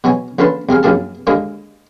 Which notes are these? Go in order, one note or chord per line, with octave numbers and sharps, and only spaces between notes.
B2 F#3 C#5 G#5
A#1 D3 C#4 B4 A5 C6
C2 C4 G#4 F5
A#1 F#2 F#3 A#3 G#4 A5
D#2 G#2 D3 G#3 A#3